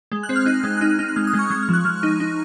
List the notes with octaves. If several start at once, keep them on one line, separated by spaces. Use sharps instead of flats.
G#3
F#6
C4
F6
D#4 F#6
G#3
F#6
D#4 F6
F#6
D#4 F6
F#6
G#3 F6
D#6
G#3
C#6
G#3 C#6
F6
F3 F#6
F3 F6
D#4
D#4